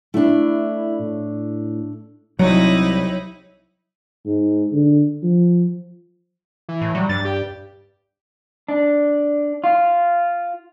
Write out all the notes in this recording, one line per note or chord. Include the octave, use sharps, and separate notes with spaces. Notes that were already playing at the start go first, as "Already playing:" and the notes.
A3 D4 E4
A2
C2 F#3 D#4 E4 C#5
G#2
D3
F3
E3
A2
F#3 G3
G2 A6
G4
D4
F4